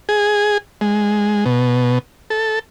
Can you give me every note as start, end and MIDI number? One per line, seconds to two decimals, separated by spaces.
0.09 0.58 68
0.81 1.44 56
1.46 1.98 47
2.30 2.59 69